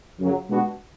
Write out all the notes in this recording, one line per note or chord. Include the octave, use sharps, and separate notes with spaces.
F#2 C#3 F#3
B2 G#3 B3 D4 F#4